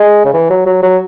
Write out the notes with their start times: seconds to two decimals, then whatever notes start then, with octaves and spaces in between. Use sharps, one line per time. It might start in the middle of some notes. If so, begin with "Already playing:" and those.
Already playing: G#3
0.25 C#3
0.34 E3
0.50 F#3
0.66 F#3
0.83 F#3